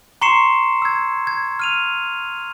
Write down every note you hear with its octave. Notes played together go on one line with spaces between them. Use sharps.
A#5 C6 C#6 C7 C#7 E7
E6 G#6
G#6
F6 D#7 F7